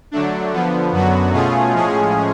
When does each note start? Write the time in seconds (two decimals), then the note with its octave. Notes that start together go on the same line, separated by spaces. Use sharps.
0.11 D3 F#3 A3 D4
0.53 D3 F3 B3
0.92 F#2 D3 F#3 B3 F#4
1.32 B2 A3 C#4 F4 G#4
1.72 A2 F3 G#3 C#4 G#4